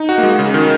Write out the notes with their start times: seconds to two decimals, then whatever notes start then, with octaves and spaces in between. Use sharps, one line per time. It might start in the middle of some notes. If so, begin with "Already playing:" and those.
Already playing: D#4
0.09 F#4
0.18 A#3
0.23 G#3
0.39 C#3
0.54 D#3